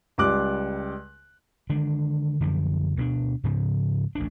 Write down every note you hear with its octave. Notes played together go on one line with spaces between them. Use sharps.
C#2 G3 D6 F#6
D3 D#3 G#3 D4
F#2 D3 E3 F3
D2 B2 G#3 D4
G#2 C#3 F3
A1 D2 D4